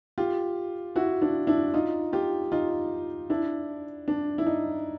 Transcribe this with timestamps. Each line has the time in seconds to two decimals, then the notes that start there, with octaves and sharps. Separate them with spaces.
0.18 F4 G4
0.96 E4 F#4
1.22 D4 E4
1.47 D4 E4
1.74 D#4 F4
2.13 F4 G4
2.52 D#4 F4
3.30 D4 E4
4.08 D4
4.38 E4
4.47 D#4